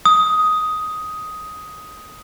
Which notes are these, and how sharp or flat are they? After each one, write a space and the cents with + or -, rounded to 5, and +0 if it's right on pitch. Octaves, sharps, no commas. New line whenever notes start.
D#6 +10